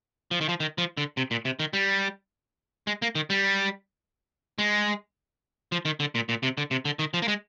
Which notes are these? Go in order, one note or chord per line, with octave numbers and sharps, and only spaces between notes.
F3
D#3
F3
D#3
F3
D3
C3
A#2
C3
D#3
G3
G#3
A#3
D#3
G3
G#3
F3
D#3
D3
A#2
A#2
C3
D3
C3
D3
D#3
F3
A#3
G#3